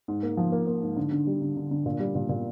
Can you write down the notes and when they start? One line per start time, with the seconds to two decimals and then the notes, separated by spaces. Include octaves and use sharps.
0.08 G#2
0.23 A#3
0.37 F3
0.52 A#3
0.67 A#3
0.83 G#2
0.96 D3
1.11 D3
1.27 G3
1.42 D3
1.57 D3
1.71 D3
1.86 A#2
2.00 G3
2.15 A#2
2.29 A#2